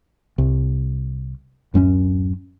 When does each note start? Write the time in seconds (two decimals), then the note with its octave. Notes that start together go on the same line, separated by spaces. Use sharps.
0.38 C2
1.74 D1 F#2 G#3 C#4